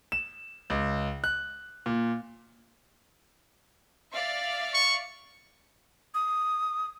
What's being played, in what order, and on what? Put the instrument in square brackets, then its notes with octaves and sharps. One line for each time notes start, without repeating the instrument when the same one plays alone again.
[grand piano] E7
C#2
F#6
A#2
[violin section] D5 E5 F5
[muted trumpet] C#6
[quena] D#6